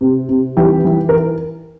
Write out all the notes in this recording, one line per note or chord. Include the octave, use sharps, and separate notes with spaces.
C3
C3
E3 G4
E3
A#4